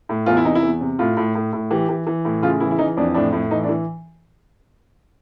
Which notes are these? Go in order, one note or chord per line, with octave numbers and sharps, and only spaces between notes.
A2
E2 F4
E4
C3 D#4
E4
E2
C3
A2 F4
A2
A2
A2
E3 G4
E3
E3
A2
C#3 F4
E3 E4
E4
E3 D#4
F2 D4
A2 D4
A2
E3 D#4
D4
E3